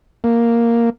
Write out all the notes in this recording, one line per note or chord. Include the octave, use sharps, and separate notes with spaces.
A#3